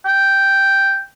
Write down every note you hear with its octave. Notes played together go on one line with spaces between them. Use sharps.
G5